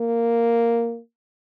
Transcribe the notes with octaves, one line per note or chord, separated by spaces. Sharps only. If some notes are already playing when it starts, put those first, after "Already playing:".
Already playing: A#3